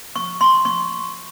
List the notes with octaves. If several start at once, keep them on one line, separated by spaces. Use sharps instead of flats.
C#6
C6
C#6